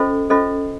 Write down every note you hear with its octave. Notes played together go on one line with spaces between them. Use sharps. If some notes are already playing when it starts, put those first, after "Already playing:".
Already playing: C#4 F4 A4 C5 D#5
C#4 F4 A4 C5 D#5